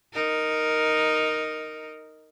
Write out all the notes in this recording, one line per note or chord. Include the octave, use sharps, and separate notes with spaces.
D#4 A#4